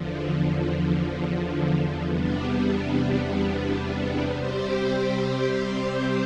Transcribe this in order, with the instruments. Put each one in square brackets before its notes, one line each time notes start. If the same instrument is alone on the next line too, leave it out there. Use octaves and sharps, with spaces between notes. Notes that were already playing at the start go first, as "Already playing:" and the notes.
Already playing: [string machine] E2 D3 F3
E2 C3 G3 B3 D4
C3 G3 C4 G4 C5